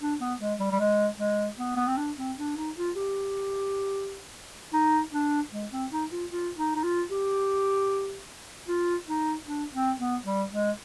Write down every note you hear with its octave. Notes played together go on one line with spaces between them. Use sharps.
D4
B3
G#3
G3
G3
G#3
G#3
B3
B3
C4
D4
C4
D4
D#4
F4
G4
D#4
D4
G#3
C4
D#4
F4
F4
D#4
D#4
F4
G4
F4
D#4
D4
C4
B3
G3
G#3